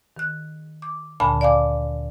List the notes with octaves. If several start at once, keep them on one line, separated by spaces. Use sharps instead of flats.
D#3 F#6
D6
D2 A#2 D3 G#5 A5 B5
D5 F5 G#5 D6